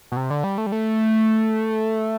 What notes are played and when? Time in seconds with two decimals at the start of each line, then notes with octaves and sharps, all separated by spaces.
0.12 B2
0.17 C3
0.30 D3
0.44 G3
0.58 A3
0.67 G3
0.72 A3